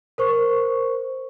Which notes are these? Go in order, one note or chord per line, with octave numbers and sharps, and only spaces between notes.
A#4 C5 C#6